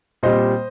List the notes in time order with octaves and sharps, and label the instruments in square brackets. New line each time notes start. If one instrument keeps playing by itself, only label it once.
[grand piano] A#2 G3 C4 C5 D#5